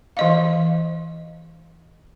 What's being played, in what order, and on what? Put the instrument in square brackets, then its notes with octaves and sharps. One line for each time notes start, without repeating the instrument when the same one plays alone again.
[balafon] E3 D#5 F5